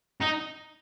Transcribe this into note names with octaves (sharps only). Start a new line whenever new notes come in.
D#4